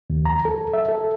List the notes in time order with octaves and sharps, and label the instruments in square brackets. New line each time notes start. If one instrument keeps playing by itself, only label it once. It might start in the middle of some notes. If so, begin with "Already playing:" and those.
[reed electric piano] D#2
A#5
A4
E5
A4